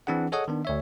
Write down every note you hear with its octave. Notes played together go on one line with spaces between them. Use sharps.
E3 C4 D4 G#4 F#5
G#4 A4 C#5 D#5 F#5 D#6
D#3 B3 D4
D2 C#5 E5